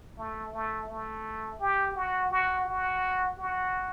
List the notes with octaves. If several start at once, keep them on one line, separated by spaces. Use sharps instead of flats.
A3
A3
A3
G4
F#4
F#4
F#4
F#4